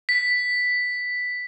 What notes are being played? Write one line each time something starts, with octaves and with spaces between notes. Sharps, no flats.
B6